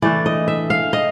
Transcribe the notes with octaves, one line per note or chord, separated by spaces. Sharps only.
E3 A3 D4 D5
D#5
E5
F5
D#5